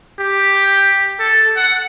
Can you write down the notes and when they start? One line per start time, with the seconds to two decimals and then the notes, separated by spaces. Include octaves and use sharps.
0.19 G4
1.20 A4
1.57 F#5